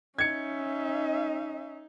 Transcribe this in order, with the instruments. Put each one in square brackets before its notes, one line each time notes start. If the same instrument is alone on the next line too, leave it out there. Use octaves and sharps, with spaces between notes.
[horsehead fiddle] C#4 E5 [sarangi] D#4 [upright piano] G#6 C#7